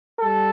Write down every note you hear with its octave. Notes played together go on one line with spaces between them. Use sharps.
G3 A4